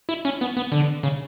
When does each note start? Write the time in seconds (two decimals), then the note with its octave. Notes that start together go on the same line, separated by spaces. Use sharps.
0.09 E4
0.25 C#4
0.41 B3
0.57 B3
0.72 D3
1.03 C#3